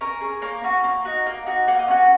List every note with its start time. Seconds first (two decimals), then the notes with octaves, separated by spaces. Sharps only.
0.01 C#4 A#4
0.21 G#4
0.42 A#3 C#5
0.64 C#4 F#4
0.84 A#3
1.05 D#4 F#4
1.26 A#3
1.46 D#4 F#4
1.68 A#3 F#5
1.79 D#5
1.88 C#4 F#4 F#5